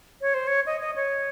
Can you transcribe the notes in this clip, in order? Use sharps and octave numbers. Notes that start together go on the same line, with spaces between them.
C#5
C5
C#5
D#5
D#5
C#5